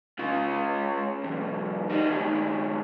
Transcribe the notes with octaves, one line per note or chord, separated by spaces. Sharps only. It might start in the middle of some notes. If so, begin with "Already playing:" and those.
C#3 F4
B1 E2
G3 D#4
G2 D#3